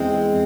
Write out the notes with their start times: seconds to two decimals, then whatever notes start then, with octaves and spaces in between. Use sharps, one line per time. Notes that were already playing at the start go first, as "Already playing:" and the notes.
Already playing: E2 E3 G#3 C4